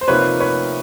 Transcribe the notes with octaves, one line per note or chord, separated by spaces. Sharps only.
C5
C3 F3 A#3 D#4 B4 C#5
B4 C#5